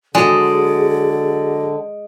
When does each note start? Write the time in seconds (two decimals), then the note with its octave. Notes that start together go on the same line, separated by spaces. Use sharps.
0.15 D3 F#3 G#3 G#4 D5